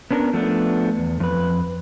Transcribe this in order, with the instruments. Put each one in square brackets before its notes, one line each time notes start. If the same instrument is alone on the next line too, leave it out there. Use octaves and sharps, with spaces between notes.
[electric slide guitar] B3 C#4 D4 G4 A#4
F3 A3 B3 D4
E2
F2 B4